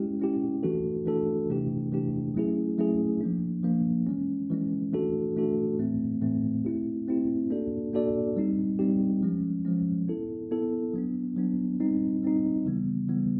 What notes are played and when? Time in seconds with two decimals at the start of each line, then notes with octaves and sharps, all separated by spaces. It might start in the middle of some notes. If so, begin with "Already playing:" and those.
Already playing: G#3 C#4 E4 G4
0.20 G#3 C#4 E4 G4
0.63 E3 A3 D4 F#4 A4
1.06 E3 A3 D4 F#4 A4
1.49 C3 E3 A3 D4 G4
1.92 C3 E3 A3 D4 G4
2.35 F#3 A3 C#4 E4 G#4
2.78 F#3 A3 C#4 E4 G#4
3.21 F3 A#3 D4
3.63 F3 A#3 D4
4.07 E3 G#3 C#4
4.50 E3 G#3 C#4
4.93 E3 A3 D4 F#4 A4
5.36 E3 A3 D4 F#4 A4
5.78 A2 E3 A3 C4
6.21 A2 E3 A3 C4
6.65 A3 C4 E4 G4
7.08 A3 C4 E4 G4
7.50 A#3 D4 F#4 A4 D5
7.93 A#3 D4 F#4 A4 D5
8.36 G3 C4 D#4 G4
8.79 G3 C4 D#4 G4
9.23 F3 G#3 C#4
9.65 F3 G#3 C#4
10.08 B3 E4 A4
10.51 B3 E4 A4
10.94 F#3 B3 D4
11.36 F#3 B3 D4
11.80 G3 C4 D#4
12.22 G3 C4 D#4
12.66 C#3 E3 G3 B3
13.08 C#3 E3 G3 B3